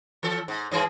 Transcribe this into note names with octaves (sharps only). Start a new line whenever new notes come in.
E3 A4
G#2
G2 E3 G#4